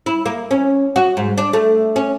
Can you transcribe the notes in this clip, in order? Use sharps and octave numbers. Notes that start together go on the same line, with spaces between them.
E4
A#3
C#4
F#4
G#2
D4
A3
C#4